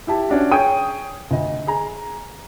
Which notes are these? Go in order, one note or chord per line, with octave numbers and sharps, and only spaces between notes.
E4 G4 A5
C#4 D4 F#4
G#4 C#5 G5 D#6 D#7
D2 D#5
G#4 A#5